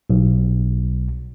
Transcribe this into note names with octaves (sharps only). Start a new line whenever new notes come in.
B1